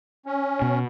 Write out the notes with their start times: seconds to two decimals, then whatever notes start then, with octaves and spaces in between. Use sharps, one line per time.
0.26 C#4
0.62 B2